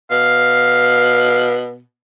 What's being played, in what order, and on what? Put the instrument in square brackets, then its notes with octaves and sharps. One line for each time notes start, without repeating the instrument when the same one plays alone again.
[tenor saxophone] B2 [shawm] F5